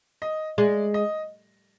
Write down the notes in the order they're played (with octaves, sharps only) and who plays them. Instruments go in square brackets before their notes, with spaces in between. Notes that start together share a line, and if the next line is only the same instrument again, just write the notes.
[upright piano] D#5
[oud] G#3 [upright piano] D5
[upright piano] D#5